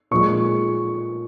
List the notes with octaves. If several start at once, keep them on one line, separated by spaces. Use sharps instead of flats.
A#2 F3 G#3 C#6